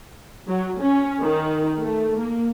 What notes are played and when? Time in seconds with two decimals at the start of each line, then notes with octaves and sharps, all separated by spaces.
0.47 F#3
0.80 C#4
1.21 D#3
1.81 A3
2.19 A#3